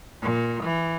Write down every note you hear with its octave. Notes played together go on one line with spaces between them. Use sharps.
A#2
E3